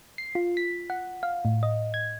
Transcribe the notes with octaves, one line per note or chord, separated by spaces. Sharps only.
C7
F4
B6
F#5
F5
A2
D#5
G#6